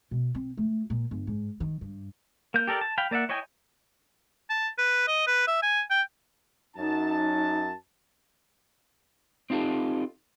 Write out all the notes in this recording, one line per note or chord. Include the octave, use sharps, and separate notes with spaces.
B2
C4
A3
A#2
G1
G#2
D#3
G2
A#3 G6
G4 A4 A#4 D5
A5
F5 G5 B5
A#3 D5 E5 F#5
E4 C#5 D#5 G5 G#5
A5
B4
D#5
B4
E5
G#5
G5
F#2 D#4 A5
C4 D#4 F4 G4 A4